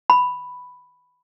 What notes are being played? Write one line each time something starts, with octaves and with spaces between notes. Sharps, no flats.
B5